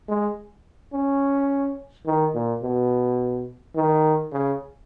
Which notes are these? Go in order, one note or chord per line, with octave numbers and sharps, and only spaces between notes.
G#3
C#4
D#3
A#2
B2
D#3
C#3